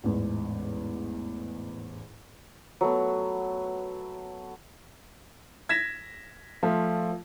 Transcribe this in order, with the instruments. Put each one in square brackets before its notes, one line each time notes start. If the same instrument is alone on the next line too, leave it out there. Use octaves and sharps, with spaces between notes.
[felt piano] A1 E2 G#2
[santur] F#3 A3 B3
[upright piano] G#6 A#6 B6 E7
F3 A3 F4